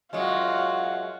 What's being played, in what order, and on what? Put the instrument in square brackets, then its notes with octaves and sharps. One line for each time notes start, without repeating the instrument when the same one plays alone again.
[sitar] F#2 F#3 G#3 [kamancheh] F4 F#4